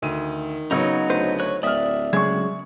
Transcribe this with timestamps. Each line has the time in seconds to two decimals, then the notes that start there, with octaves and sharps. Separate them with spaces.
0.03 D2 D#3 D#7
0.71 C#3 F#3 B3 D#4 F#4 C#5
1.10 D2 B4 C5
1.40 C#5 F#6
1.63 D1 D5 E5 D#6 F6
2.13 D1 C#3 F#3 G#3 C#6 G#6